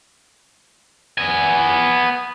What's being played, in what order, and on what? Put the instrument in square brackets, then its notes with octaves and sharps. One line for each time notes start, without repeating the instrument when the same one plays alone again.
[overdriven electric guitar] B3 G#5